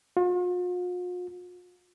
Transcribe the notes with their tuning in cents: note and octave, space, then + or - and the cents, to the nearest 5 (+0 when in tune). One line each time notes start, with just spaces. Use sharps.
F4 +45